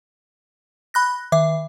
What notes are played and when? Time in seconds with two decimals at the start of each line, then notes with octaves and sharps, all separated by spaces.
0.94 B5 F#6 A#6
1.32 D#3 E5 D6